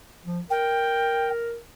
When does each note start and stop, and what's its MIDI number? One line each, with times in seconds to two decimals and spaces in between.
0.25 0.40 53
0.50 1.57 70
0.50 1.29 79